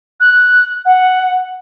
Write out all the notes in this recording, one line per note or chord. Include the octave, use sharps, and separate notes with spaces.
F#6
F#5